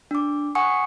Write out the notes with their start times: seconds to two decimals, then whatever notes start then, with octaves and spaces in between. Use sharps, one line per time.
0.11 D4 D6
0.55 F#5 G#5 C#6 D#6 C#7